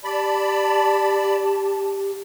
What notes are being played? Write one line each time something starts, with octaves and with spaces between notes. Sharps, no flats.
G4 D5 A5 B5